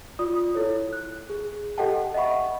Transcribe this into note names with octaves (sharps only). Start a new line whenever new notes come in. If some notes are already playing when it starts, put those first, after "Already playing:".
F4 D5 D#6
E4 A4 C#5
F#6
G#4
G4 A4 D#5 F#5 G5 A5
D#5 E5 F#5 B5 C#6